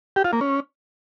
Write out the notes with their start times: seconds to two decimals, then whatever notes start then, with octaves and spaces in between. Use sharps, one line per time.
0.16 G4
0.24 F4
0.33 A#3
0.41 C#4